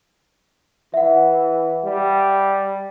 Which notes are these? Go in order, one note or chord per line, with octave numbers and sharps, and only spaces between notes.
E3 E5 F#5
G3